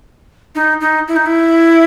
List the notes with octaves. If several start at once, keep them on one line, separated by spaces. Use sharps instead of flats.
D#4
D#4
E4
D#4
E4